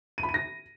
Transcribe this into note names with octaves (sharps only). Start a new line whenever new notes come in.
D#7
B5
D#7
A#6